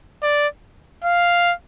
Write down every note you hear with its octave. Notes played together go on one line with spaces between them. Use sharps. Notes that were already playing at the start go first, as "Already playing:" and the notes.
D5
F5